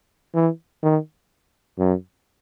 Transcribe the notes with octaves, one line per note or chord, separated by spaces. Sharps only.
E3
D#3
F#2